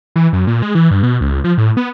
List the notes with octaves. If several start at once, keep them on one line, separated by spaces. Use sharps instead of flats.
E3
F#2
A#2
G#3
E3
G2
B2
C#2
F3
A2
B3